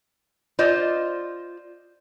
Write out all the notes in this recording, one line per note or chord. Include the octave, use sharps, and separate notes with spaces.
F4 C5 D5 D#5